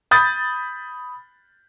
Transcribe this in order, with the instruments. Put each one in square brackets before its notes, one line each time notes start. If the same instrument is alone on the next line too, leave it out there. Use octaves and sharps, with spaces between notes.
[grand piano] B5 D#6 G6 A6